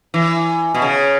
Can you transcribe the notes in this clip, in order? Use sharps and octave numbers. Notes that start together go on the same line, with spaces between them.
E3
B2
C#3